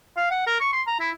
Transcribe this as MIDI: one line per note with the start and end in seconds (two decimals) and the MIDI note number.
0.17 0.27 77
0.31 0.45 78
0.47 0.56 70
0.60 0.71 85
0.73 0.82 84
0.87 0.98 82
1.00 1.11 64